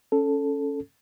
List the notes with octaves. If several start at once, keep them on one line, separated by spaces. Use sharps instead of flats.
C#4 A4